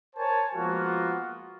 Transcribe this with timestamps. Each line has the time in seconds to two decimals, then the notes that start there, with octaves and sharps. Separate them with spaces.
0.15 A#4 C5 C#5 G#5 A5
0.55 F3 G#3 A#3 B3 F4 F#4